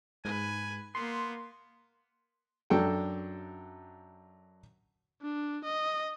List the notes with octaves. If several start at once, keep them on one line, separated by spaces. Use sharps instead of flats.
G#2 B4 G#5
A#3 B3 C6
F#2 F#3 D4 A4 G5
D4
D#5